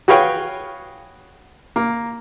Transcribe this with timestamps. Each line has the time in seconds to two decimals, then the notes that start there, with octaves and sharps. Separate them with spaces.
0.08 F#4 G#4 B4 C#5 F5 G5
1.76 A#3